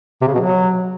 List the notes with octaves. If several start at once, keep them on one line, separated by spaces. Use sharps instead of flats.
C3
C#3
B2
F#3